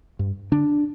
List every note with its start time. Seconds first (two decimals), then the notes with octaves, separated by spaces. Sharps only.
0.19 G2
0.52 D3 D4